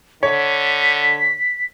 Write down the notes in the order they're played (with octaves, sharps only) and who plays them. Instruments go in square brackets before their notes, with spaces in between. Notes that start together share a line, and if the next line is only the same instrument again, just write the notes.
[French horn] D3 [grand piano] C#5 [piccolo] B6